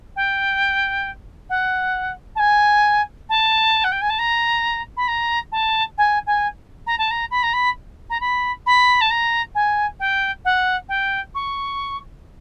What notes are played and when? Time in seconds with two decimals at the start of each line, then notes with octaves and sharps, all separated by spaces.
0.16 G5
1.50 F#5
2.36 A5
2.39 G#5
3.29 A5
3.84 F#5
3.92 G5
4.02 G#5
4.10 A5
4.19 A#5
4.97 B5
5.08 A#5
5.52 A5
5.98 G#5
6.27 G#5
6.87 A#5
6.98 A5
7.11 A#5
7.31 B5
7.43 A#5
7.53 B5
8.10 A#5
8.20 B5
8.66 B5
9.01 A5
9.11 A#5
9.55 G#5
10.00 G5
10.45 F#5
10.89 G5
11.35 C#6